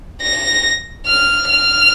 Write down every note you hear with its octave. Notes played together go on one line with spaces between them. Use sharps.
A#6
F6
F6